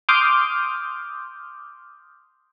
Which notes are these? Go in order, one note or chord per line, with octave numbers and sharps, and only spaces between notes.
C6 D6 D#6 F6 G6